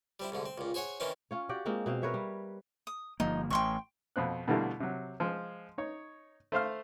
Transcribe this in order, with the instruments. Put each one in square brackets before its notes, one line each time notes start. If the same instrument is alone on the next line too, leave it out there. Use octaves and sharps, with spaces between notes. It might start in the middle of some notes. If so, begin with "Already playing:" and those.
[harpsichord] G3 C4 E4
C2 G#2 D3
C4
C#2 A#2
G#4 C5 C#5 F#5 G#5
D#3 E3 C4 C#4 D#4
[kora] C#4 F4 C#5
F#4 G4 D5
G#3 A#3 C4 F4
B2 C4 F5
A#4 B4 C#5 E5
G3
[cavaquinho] D#6
[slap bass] G1 F3 A#3 [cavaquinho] D#4
[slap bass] A1 A2 [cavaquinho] G5 C6 C#6
[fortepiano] F2 B2 C4 F#6
B2 D3 E3 G3 A3 A#3
C3 F#3
F3 G#3
D#4 C#5
A3 C5 F5 F6